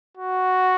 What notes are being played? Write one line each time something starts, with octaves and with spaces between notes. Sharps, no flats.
F#4